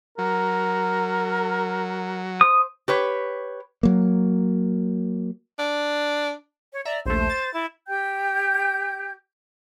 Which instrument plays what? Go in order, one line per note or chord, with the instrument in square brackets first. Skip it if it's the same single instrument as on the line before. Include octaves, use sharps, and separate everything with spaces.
[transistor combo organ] F#3 [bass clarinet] A#4
[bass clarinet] C5 [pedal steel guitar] D#6
[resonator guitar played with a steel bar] G4 B4 C#5
[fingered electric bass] F#3 A#3
[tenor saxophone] D4
[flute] C#5
[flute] D5 [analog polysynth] E5 A#5
[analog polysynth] A#1 D#2 A3 [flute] C5
[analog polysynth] A6
[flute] E4
[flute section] G4 G5 G6